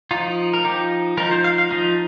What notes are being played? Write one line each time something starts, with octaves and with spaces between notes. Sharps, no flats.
F3 D#4 F4
A#4
F3 D#4 G4
F3 D#4 A#4
C5
F5
F5
F3 D#4 D#5